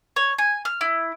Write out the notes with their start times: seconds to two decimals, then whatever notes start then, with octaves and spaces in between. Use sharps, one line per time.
0.16 C#5
0.38 G#5
0.65 F6
0.81 E4